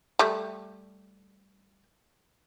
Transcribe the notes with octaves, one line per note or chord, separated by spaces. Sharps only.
G3 A3